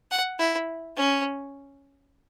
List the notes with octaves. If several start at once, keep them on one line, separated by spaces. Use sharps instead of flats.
F#5
E4
C#4